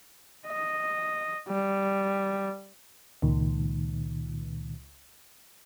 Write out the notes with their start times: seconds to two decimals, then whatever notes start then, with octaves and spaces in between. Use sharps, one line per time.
0.48 D#5
1.49 G3
3.22 C#2 A#2 D#3